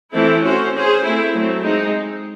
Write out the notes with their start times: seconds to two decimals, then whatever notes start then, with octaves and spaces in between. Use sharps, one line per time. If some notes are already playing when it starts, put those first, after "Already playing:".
0.14 E3 A3 C4 E4 A4
0.44 C#4 F#4 C5
0.74 C#4 G#4 C5
1.04 A3 C4 E4
1.34 F#3 A3 C4
1.64 G#3 C4 D#4